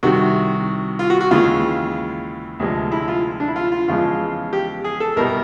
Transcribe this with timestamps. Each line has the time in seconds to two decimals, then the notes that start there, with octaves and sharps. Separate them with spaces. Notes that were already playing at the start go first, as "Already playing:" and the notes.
0.03 C2 C3 D#3 F#4
0.99 F4
1.10 F#4
1.21 F#4
1.31 D#2 C#3 E3 G#3 F4
2.60 D2 C3 F3 G#3
2.92 E4
3.08 F4
3.40 D4
3.48 E4
3.56 F4
3.72 F4
3.88 E2 C#3 F3 G#3 F4
4.53 G4
4.84 G#4
5.00 A4
5.16 C2 B2 G3 A#4